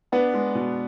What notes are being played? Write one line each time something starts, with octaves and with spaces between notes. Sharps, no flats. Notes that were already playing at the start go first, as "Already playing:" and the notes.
B3 D4 B4
G#3
B2